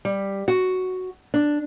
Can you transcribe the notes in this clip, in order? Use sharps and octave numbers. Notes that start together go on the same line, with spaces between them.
G3
F#4
D4